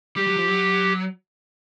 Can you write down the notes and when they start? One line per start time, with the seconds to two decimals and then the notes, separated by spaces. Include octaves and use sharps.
0.16 G3 G4
0.27 F#3
0.36 F3
0.48 F#3